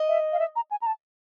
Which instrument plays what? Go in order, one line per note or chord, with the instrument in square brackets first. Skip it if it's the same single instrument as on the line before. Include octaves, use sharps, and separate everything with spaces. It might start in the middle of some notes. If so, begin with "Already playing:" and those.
Already playing: [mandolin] D#5
[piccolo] E5
F5
E5
A#5
G#5
A#5
A5